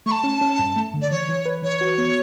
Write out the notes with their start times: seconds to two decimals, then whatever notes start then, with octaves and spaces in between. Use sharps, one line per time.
0.06 A3 C#6
0.11 A5
0.24 C#4
0.41 C#4
0.59 G2
0.76 A3
0.94 D3
1.02 D5
1.11 E3 C#5
1.28 E3
1.46 B4
1.63 E3 C#5
1.81 F#4
1.98 B3